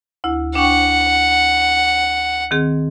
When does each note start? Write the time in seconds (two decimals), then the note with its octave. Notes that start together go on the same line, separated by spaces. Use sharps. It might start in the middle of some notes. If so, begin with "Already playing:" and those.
0.24 D2 E4
0.55 D4 F#5 G5 C#6
2.51 D#3 C4 G#4